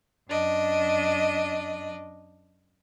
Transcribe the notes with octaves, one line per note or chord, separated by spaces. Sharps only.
F#2 D4 D#5